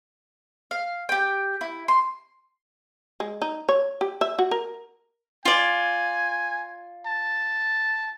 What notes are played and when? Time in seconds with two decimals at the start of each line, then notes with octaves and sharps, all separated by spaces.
0.71 F5
1.09 G4 G5
1.61 E4
1.88 C6
3.20 G#3
3.42 D#4
3.69 C#5
4.01 G4
4.21 E5
4.39 F#4
4.51 A#4
5.45 F4 D5 G#5
7.06 A5